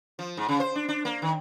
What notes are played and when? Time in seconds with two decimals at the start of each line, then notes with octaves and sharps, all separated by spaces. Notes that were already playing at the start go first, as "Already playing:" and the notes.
0.19 F3
0.37 G#2
0.48 C#3
0.60 C5
0.75 D4
0.88 D4
1.05 A#3
1.22 D#3